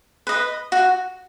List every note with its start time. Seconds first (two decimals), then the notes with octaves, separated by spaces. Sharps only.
0.27 B4 D#5
0.72 F#4